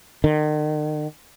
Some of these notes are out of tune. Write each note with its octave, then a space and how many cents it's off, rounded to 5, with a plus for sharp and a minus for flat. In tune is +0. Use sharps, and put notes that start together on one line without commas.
D#3 -40